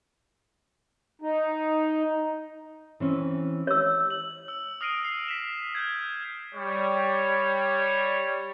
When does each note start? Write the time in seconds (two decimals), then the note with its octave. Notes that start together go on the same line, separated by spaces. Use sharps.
1.22 D#4
3.00 E3 C4 C#4
3.67 C#5 E6
4.10 F#7
4.48 E6
4.81 D#6 F6 A#6 C7 D7 D#7
5.05 C7
5.28 B6 E7
5.75 F6 G6 G#6
6.55 G3 C#5